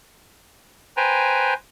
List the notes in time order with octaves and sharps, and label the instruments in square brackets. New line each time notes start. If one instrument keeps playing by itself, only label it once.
[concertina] B4 C5 G5 G#5 A#5